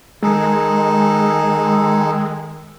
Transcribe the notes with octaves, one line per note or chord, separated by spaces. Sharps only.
D#3 G#3 D#4 G#4 A4